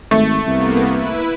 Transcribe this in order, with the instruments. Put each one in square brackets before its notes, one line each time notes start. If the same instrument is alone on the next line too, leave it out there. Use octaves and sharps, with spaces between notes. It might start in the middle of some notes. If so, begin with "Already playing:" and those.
[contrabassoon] G#1 [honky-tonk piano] A3
[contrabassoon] C2 [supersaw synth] A#3 B3
[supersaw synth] E4 B4